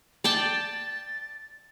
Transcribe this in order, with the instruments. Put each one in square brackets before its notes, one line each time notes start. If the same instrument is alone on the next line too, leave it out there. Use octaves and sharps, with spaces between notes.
[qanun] D5 G5 A5 [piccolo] A6